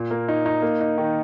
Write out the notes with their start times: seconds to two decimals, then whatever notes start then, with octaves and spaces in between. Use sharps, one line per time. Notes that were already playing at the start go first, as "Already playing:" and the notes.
Already playing: A#2
0.11 A#3
0.28 D#4
0.46 D#4
0.62 A#3
0.81 D#4
0.98 D#3